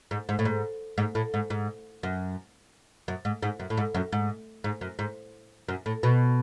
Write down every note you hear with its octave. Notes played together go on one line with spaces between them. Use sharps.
G#2
G#2
A2
G#2
G#2
A2
G#2
G#2
F#2
F#2
G#2
G#2
F#2
A2
G#2
F#2
G#2
G#2
F#2
G#2
F#2
A2
B2